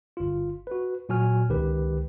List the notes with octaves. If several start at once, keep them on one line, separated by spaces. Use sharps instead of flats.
G1 F4
F#4 B4
A#2 F#3 F#4 G#5 F6
C#2 D#3 G4 B4